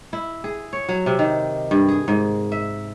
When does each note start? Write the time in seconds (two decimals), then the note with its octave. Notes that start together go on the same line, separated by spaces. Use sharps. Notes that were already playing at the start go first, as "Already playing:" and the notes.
0.13 E4
0.44 G#4
0.73 C#5
0.89 F#3
1.06 C3
1.19 D#3
1.71 G2
1.88 G#4
2.08 G#2
2.52 E5